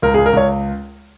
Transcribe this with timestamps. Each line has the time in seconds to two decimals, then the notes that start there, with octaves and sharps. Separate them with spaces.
0.02 C#2 A#4
0.14 G#4
0.18 C#2
0.26 A#4
0.33 C#2 C#5